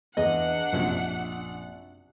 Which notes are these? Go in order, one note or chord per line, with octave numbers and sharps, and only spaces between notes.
E2 D4 D#5 F#5
A#1 F#2 C3